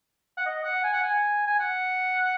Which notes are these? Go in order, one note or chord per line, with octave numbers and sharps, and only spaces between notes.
F#5
D#5
F#5
G#5
F#5
G#5
G#5
F#5